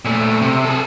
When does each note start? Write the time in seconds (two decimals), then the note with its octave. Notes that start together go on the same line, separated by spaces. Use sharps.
0.05 A#2 A3
0.42 C3
0.65 G#4 A4